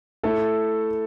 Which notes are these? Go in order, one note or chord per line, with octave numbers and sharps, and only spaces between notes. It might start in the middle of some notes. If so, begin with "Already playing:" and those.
A3 E4 A4